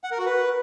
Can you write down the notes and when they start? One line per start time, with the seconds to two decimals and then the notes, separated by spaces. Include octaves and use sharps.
0.04 F#5
0.11 A#4
0.19 F#4
0.26 B4